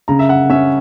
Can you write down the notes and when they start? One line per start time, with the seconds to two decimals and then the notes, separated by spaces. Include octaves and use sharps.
0.08 C#3 A#5
0.19 E5
0.29 F#5
0.50 C#4 E5